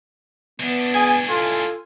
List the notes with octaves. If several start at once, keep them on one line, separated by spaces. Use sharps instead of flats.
E3 B3 D4
G#4 G#5
F4 A4